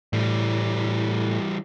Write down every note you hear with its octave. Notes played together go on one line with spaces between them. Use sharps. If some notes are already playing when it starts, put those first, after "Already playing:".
A2 E3 G3